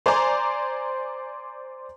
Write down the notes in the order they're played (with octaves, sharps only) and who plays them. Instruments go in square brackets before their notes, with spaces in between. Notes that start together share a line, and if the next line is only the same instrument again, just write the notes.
[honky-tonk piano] C5 D5 G#5 A#5 C6 D6